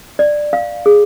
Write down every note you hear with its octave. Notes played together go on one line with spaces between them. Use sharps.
D5
F5
G#4